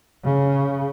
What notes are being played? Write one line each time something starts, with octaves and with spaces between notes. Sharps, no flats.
C#3